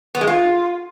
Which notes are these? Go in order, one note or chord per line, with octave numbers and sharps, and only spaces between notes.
B3
G#3
F4